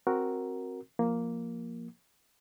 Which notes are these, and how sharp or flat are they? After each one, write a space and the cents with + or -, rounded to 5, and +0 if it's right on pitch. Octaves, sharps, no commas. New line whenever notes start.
C4 +10 F#4 +0 A#4 +0
F3 +0 A#3 +0